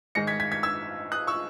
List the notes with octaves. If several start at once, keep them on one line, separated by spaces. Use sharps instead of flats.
G#2 D#3 G#3 A#6 C#7
G#6 B6
G#6 B6
G#6 B6
E6 G#6
D#6 F#6
C#6 E6